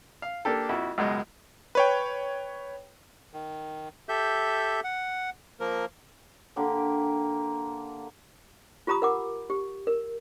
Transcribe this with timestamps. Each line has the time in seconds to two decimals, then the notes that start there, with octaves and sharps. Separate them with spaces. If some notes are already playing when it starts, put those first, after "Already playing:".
0.22 F5
0.45 A#3 D4 G4 A4
0.69 F2 E4 F#4
0.98 C#2 F#2 B2 G#3
1.75 B4 C#5 G5
3.33 D#3
4.09 G4 A4 E5 G6
4.84 F#5
5.60 F3 A#3 A#4
6.56 D3 A#3 G4 B5
8.87 F4 G4 A#5 B5 D#6
9.02 A#4 F#5 D6
9.50 G4
9.87 A#4